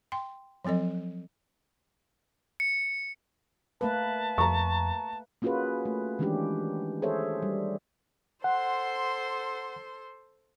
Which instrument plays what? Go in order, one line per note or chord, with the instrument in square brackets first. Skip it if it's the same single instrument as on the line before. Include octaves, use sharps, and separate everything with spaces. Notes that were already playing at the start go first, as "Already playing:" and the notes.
[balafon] G5 C6
F3 F#3 C4 A4 D#5
[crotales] C#7
[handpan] A3 A#3 B4 [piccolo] A5
[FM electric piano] F2 [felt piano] A#5 C#6
[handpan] A#3 C#4 F4 F#4 G#4 B4
A3
D#3 E3 G#3 C#4 D4 G4
G#4 A4 C5 C#5 E5
G3
[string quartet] A4 C5 C6 [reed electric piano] F#5